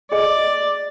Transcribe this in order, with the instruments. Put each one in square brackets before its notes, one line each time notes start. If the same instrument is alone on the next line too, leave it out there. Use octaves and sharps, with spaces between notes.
[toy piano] G#4 D#5 [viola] D5